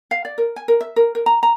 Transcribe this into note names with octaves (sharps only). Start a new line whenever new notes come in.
F5
D5
A#4
G#5
A#4
E5
A#4
A#4
A#5
A#5